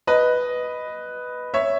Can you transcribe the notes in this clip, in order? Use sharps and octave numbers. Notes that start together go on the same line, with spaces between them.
B4 D#5
C#5 E5